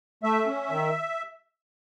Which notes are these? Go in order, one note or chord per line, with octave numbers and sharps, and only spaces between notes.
A3 E5
C#4
D#3